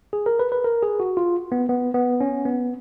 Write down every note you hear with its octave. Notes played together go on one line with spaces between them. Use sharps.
G#4
A#4
B4
B4
A#4
G#4
F#4
F4
B3
B3
B3
C#4
B3